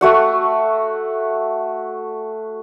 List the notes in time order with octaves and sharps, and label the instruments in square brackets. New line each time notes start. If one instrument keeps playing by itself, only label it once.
[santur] A3 F#4 F#5